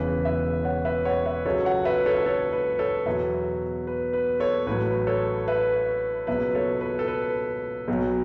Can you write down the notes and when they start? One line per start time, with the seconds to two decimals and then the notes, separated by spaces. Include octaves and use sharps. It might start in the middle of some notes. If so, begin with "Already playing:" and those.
Already playing: E1 E2 C#3 E3 B4
0.25 B4 E5
0.65 C#5 F#5
0.85 B4 E5
1.05 C#5 F#5
1.26 B4 E5
1.45 C#2 C#3 F#3 A4 C#5
1.65 C#5 F#5
1.85 B4 E5
2.06 A4 C#5
2.26 A4 C#5
2.53 B4
2.79 A4 C#5
3.06 E2 B2 F#3 B4 E5
3.87 B4
4.13 B4
4.40 A4 C#5
4.66 A1 A2 F#3 B4
5.07 A4 C#5
5.48 B4 E5
6.27 C#2 B2 F#3 B4 E5
6.55 A4 C#5
6.81 B4
6.99 A4
7.08 B4
7.88 B1 B2 F#3